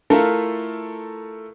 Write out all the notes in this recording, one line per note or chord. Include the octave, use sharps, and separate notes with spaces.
A3 E4 F4 A4 A#4